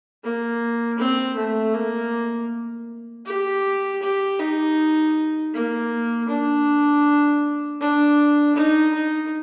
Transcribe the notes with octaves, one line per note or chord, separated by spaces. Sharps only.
A#3
C4
A3
A#3
G4
G4
D#4
A#3
D4
D4
D#4
D#4